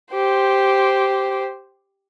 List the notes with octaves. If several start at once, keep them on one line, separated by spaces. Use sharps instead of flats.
G4 C5